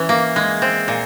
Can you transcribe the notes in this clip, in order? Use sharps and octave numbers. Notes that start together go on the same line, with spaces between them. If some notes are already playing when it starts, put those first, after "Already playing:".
Already playing: E3 C#4
A#3
G#3
C4
A#2